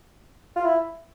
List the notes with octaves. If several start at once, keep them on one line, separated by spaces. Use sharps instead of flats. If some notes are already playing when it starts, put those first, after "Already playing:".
F4
E4